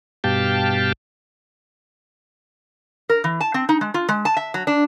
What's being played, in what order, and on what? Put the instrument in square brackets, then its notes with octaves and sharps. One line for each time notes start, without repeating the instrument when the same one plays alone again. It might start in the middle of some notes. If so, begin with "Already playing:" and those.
[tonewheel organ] G2 B2 G4 F5 G5 A5
[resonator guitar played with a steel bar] A#4
E3
A5
C4
D#4
G#3
F4
G#3
A5
E5
F#3
D4